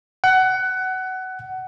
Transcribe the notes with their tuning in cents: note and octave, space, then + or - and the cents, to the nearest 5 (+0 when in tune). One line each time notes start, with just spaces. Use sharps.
F#5 +20